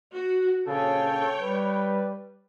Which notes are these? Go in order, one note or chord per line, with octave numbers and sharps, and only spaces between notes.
F#4
A#1 C#3 A4 C#5 G5
G3 B4